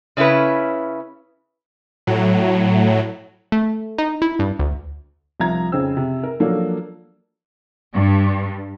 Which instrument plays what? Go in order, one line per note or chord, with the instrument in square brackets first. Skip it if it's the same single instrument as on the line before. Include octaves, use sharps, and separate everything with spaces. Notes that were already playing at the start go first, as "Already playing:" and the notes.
[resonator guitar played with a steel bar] C#3 C#4 E4 G4 B4
[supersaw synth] A2 F#3
[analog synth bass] A3
D#4
E4
G2
D2
[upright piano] C2 F3 E5 A#5 G#6
F2 C#3 C4 C5 E6
C3
A#4
F3 F#3 A#3 D4 F#4 A4
[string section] G2